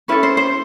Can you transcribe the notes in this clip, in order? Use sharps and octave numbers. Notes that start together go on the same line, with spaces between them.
C#4 E4 A4 B4
C5
C5